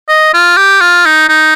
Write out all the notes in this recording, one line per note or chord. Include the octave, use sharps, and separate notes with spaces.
D#5
F4
G4
F4
D#4
D#4